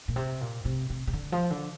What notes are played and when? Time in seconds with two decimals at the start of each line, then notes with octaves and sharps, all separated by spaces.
0.08 A#2
0.16 C3
0.41 A#2
0.65 C3
0.90 C3
1.07 C3
1.13 D3
1.32 F3
1.51 D3